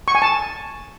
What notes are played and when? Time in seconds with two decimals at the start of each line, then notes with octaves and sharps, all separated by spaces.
0.08 C#6
0.15 G#5
0.22 A5